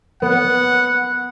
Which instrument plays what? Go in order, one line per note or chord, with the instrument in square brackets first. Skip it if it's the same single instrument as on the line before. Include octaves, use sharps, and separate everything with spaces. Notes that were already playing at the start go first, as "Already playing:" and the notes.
[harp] B3 [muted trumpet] F#5